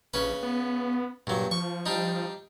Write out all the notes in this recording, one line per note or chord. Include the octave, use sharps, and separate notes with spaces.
A#1 C#3 C#4 B4
B3
G2 A#2 F#3
F3 C#6
G3 D4 D#4